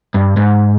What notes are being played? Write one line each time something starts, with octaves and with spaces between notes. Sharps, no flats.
G2
G#2